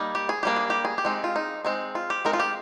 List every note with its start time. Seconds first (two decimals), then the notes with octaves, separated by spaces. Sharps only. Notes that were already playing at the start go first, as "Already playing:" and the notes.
Already playing: G3 A#3 D#4
0.15 G4
0.29 G#4
0.43 G3 A#3 D4 G4
0.56 G#4
0.70 G4
0.85 G#4
0.98 G4
1.05 G#3 C4 D#4
1.24 F4
1.36 D#4
1.65 G#3 C4 D#4
1.95 F4
2.10 G4
2.25 G#3 C4 D#4 A#4
2.33 F4
2.40 G4